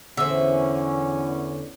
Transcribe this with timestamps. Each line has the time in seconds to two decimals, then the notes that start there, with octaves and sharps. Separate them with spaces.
0.17 E2 D3 C4 C#4 E5